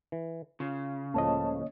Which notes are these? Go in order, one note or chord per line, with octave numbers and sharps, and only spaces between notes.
E3
C#3 F4
C#2 A2 F3 A#3 C#5 D#5 A5